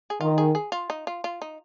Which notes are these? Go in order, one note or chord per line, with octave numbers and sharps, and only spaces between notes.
G#4
D#3 F4
G#4
G#4
F4
D#4
F4
F4
D#4